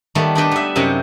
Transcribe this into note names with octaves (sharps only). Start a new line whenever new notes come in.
D#3 G3 A3 B3
D4 D#4 B4 G5
B3 E5
F#2 C3 D#4 F#5 G5